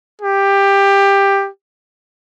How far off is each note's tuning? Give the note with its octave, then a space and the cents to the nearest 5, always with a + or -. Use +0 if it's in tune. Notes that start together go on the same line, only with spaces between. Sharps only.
G4 +15